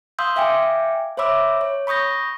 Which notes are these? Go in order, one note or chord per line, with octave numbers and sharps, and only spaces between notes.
F5 C6 D#6 E6 G6
E5 F5 G5 G#5 D6
C5 C#5 E5 B5 D6 E6
C#5
B5 C#6 D#6 G6 A#6